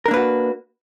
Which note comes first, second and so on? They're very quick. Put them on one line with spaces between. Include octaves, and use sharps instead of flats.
A#4 D4 A#3 B4 F#4